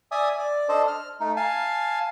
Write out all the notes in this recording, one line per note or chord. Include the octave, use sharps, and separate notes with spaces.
D5 E5 G#5 D#6
D5
D4 A4 C5 D#5
F6
A3 D#4
F5 G#5 A5